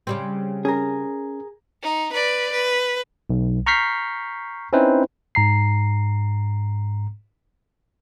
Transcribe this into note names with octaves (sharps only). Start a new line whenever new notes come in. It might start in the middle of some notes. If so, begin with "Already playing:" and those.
C#3 G3 C4
C#4 G#4 A#4
D#4
B4 D5
B4
B1
A#5 C#6 F6 G6 B6 C7
C4 C#4 D#4 E4 B4 C5
G#2 A#5 C7